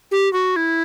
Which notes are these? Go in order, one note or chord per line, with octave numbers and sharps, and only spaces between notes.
G4
F#4
E4